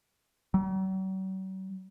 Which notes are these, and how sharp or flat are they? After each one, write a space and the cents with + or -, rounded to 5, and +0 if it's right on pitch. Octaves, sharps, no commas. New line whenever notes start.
F#3 +45